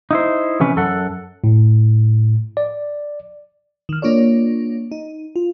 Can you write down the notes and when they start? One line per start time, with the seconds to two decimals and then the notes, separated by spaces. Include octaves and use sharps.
0.11 D#4 E4 C5
0.60 C3 E3 C#4 B4
0.76 F#2 A4 F#5
1.44 A2
2.57 D5
3.89 D#3 F6
4.02 A#3 D4 F4 C#5 D5
4.92 D#4
5.36 F4